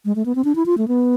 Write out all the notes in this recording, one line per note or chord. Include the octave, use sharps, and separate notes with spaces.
G#3
A3
B3
C4
D4
E4
F4
A3
B3